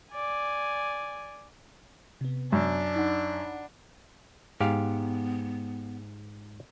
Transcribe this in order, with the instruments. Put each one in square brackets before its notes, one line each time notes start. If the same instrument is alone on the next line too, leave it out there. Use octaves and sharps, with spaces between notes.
[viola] D5 G#5
[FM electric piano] C3 B3
[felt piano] F#2 [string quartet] D4
[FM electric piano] D#4 F#5 B5
[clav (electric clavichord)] G#2 G4 F5 [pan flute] B3